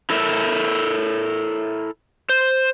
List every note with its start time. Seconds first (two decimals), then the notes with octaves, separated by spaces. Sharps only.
0.10 E4 A4 A#4 E5
2.29 C5